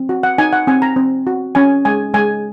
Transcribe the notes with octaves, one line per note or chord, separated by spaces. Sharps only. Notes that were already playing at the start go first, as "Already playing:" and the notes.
Already playing: C4
F#4
F#5
D#4 G#5
F#5
C4 G#5
A#5
C4
F#4
C#4 G#5
G#3 G#5
G#3 G#5